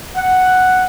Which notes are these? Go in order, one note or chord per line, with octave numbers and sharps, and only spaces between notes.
F#5